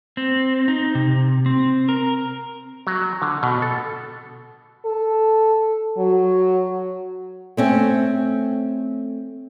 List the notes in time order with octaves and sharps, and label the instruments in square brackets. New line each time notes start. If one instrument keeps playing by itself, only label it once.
[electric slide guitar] C4
D#4
C3
C4
A#4
[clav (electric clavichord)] F#3
D3
B2
A4
[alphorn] A4
F#3
[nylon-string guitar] A3 C4 C#4